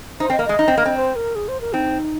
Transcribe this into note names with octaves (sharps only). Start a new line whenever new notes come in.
D#4 C5
C4
D#5
A#3
G#3 D#5
D#4
C4
A#3
C4
C5
A#4
G#4
C5
A#4
C4 D#4